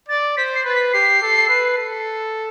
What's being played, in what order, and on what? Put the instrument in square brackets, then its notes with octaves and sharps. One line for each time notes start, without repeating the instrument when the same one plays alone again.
[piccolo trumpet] D5 [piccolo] A6
[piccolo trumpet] C5 [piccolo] B6
[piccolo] C7
[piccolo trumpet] B4 [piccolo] A6
[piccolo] B6
[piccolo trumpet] G4 [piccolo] C7
[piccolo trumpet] A4
B4
A4